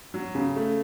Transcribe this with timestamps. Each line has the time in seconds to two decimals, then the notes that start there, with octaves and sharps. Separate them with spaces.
0.14 F#3
0.35 C#3
0.56 A3